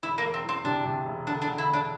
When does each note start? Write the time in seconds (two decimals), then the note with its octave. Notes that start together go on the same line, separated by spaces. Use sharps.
0.03 E1 E4
0.18 A#3
0.24 E1
0.34 C4
0.44 E2 C4
0.64 C3 D4
0.86 C3
1.06 E1
1.27 D3 D4
1.42 D4
1.48 D3
1.58 E4
1.68 E1
1.74 D4